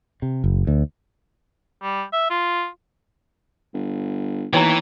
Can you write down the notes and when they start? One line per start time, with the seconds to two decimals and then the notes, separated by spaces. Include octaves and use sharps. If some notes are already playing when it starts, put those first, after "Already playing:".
0.22 C3
0.44 F#1
0.67 D2
1.82 G3
2.13 E5
2.30 F4
3.74 G1
4.53 D#2 E3 B3 C#5 G5 A5 A#5